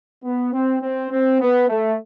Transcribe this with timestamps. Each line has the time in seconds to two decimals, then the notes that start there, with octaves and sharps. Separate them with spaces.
0.24 B3
0.53 C4
0.82 C4
1.11 C4
1.41 B3
1.69 A3